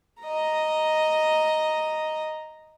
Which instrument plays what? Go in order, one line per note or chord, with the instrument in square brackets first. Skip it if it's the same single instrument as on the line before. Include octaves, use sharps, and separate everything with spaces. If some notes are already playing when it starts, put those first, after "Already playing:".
[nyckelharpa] D#5 A#5